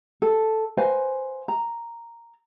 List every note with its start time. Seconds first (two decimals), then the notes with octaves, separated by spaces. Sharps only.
0.22 A4
0.77 B4 C5 F5 G#5
1.48 A#5